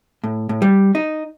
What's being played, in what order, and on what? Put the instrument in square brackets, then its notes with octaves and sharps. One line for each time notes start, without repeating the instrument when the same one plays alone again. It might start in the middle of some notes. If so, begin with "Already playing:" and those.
[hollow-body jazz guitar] A2
A2
G3
D#4